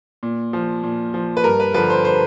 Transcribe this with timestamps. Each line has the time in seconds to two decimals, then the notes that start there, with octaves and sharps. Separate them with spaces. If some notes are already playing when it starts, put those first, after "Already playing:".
0.23 A#2
0.53 F3
0.83 A#2
1.14 F3
1.37 B4
1.44 G2 A#4
1.60 B4
1.74 D3 F3 B4
1.90 C5
2.05 C5